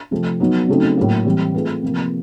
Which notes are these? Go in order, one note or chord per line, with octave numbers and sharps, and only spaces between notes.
C3 F3 A3 C4
F#3 B3 D#4
C#3 F#3 A3 C4 D#4
A2 F#3 A#3
E3 G3 C4
A3 C4 F4 G#4 B4
C3 F3 A#3